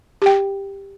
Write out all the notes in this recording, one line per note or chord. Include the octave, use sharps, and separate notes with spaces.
G4 G5